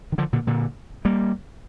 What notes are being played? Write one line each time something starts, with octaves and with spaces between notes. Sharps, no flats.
D#3
D3 F3
A#2 D3
A#2 D3
G3 A#3